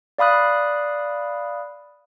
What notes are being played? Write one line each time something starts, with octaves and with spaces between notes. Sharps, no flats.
D5 F5 B5 D#6 F#6